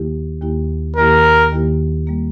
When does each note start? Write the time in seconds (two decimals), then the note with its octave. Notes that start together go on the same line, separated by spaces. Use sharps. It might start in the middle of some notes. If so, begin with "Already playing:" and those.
Already playing: D#2 D#3 A#3 E4 G4
0.41 D#2 D#3 A#3 E4 G4
0.96 D#2 D#3 A#3 E4 G4 A#4
1.52 D#2 D#3 A#3 E4 G4
2.07 G3 A#3